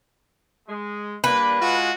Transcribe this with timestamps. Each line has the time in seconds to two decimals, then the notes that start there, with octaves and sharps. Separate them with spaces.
0.69 G#3
1.24 G3 A#3 D4 B4
1.61 G#3 F4 F#4